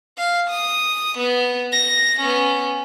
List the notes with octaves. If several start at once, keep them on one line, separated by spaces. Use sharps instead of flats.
F5
D#6
B3
A#6
B3 C#4